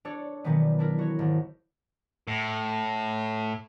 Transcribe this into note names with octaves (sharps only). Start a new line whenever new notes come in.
D4 A4 C#5
B2 D#3 E3 F#3 G3 B3
D4 E4 A#4
F#4 C#5
G#1
A2